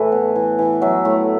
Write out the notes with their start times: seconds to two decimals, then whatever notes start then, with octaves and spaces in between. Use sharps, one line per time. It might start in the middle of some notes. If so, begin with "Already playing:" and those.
Already playing: A2 E3 A4 B4 E5
0.12 B3
0.35 E3
0.59 E3
0.82 F#3 E5
1.05 A2